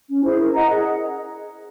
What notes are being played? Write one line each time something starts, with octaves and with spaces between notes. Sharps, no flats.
C#4
E4 G#4 C5
A#4
D#5 F#5 A#5
G#4